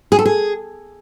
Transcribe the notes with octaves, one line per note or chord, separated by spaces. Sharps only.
G#4
A4
G#4